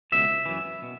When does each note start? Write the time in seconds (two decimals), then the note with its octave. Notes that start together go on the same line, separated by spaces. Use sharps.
0.12 C#2 B2 E5
0.46 F#2 E3
0.83 B2